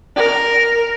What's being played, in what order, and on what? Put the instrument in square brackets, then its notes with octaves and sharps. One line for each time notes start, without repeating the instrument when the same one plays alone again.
[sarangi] A#4